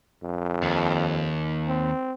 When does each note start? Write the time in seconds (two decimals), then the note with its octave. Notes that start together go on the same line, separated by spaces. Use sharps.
0.23 F2
0.63 D#2
1.67 C4